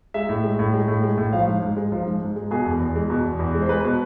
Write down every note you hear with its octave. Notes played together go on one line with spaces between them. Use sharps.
G#3 E5
A2
G#3
A2
G#3
A2
G#3
A2
F3 F5
G#2
G#2
G#3
F3
G#2
G#2
G#3
B2 G#4
E2
E2
G#3
B2
E2
E2
G#3
C5
G#3 B4
B2